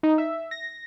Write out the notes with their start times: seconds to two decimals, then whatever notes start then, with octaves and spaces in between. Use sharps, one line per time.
0.03 D#4
0.18 E5
0.51 A#6